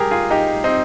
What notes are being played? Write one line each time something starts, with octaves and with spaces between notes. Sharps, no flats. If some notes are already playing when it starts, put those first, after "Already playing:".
Already playing: G2 G4 G#4 A#4
F4 G#4
D#4 G4
C4 D#4